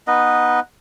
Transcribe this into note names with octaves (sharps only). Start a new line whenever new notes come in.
B3 D#4 B4 D#5